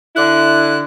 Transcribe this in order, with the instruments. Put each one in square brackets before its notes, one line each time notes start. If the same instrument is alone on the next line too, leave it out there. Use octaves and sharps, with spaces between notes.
[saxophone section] D3 E4 [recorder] F#6